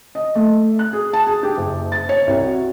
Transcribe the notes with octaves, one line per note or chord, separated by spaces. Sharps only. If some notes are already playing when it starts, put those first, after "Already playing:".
D#5
A3
F#6
G#4
A5
G#4
G4
F#1
A6
C#5
C2
F#4